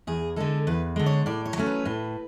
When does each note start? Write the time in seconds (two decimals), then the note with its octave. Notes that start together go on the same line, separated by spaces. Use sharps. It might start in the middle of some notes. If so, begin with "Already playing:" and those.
0.07 E2 G#4
0.36 D3 G#3 A4
0.67 E2 B4
0.96 D3 G#3
1.06 C#5
1.26 A2 D5
1.45 C#5
1.56 F#3 A3 C#4
1.66 B4
1.85 A2